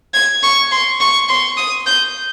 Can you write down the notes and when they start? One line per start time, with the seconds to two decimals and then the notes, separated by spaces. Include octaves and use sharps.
0.14 G#6
0.43 C#6
0.72 C6
1.00 C#6
1.29 C6
1.57 D#6
1.86 G6